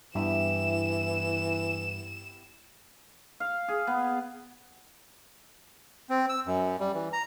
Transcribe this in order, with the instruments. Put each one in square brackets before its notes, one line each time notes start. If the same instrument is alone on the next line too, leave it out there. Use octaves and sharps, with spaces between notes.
[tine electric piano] G2 [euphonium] E3 [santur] B3 E4 G4 [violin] E7
[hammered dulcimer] F5
G#4
B3
[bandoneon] C4
E6
F#2
G3
E3
A#5